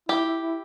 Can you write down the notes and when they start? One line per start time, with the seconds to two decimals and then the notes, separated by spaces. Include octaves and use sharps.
0.09 E4 G4
0.25 E4
0.42 E4